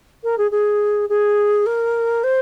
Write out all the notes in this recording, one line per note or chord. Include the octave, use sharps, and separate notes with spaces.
A#4
G#4
G#4
G#4
A#4
C5